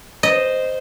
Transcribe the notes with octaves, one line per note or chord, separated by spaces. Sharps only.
C5 D#5